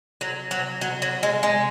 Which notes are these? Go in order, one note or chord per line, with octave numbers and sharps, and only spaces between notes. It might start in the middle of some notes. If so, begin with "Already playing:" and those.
F#3
F#3
F#3
F#3
G#3
G#3